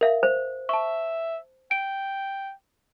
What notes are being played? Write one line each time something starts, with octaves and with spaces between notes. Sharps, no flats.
A#4 E5 F5
C5
E5 A5 C#6
G5 D7